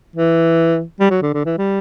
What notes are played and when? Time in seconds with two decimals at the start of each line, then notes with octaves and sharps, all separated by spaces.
0.16 E3
1.00 G3
1.11 F#3
1.22 D3
1.34 D3
1.45 E3
1.58 G3